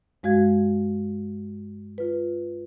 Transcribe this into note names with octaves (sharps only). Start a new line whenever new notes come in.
G2 G#3 F#4 F5 G#6
F4 B4